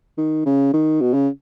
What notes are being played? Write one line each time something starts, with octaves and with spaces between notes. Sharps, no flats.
D#3
C#3
D#3
B2
C#3